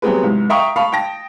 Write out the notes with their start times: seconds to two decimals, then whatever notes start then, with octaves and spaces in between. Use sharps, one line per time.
0.02 F#3 G3 B3 C4 G#4 B4
0.23 C2 G#2
0.50 E5 F5 G5 A#5 C#6 D#6
0.76 F5 A5 B5 C#6
0.92 G5 A5 A#6